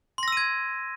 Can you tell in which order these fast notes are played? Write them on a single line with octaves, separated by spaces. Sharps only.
C6 A#6 E6 D#7 G#6